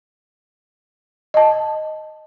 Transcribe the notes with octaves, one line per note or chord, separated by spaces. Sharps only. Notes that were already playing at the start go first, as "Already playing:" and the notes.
D#5 A5